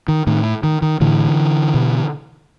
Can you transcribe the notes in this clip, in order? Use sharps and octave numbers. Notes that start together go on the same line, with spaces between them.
D#3
A2 D#3
D#3
D#3
A2 D3 E3
B2